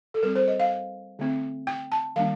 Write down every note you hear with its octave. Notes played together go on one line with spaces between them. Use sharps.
A4
G3 C4 A#4
C5
D#5
F5
D3 A3 C4
G5
A5
D#3 G3 A#3 D4 F5